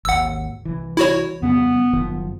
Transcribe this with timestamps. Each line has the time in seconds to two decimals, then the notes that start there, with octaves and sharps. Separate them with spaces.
0.05 G#1 D#2 F#5 E6
0.65 C2 E3
0.97 E4 F#4 C#5
1.42 F2 C#3 G3 B3
1.93 F#1 D#3 F3